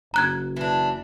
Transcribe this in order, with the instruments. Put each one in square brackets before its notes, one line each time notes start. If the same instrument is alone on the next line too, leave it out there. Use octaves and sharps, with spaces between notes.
[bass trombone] F#1 [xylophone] A#5 F#6 G#6
[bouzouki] E3 D4